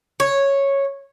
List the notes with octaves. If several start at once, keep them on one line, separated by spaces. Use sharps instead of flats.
C#5